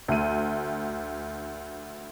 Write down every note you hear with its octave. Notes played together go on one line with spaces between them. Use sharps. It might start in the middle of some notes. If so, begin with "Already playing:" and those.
D2 D#7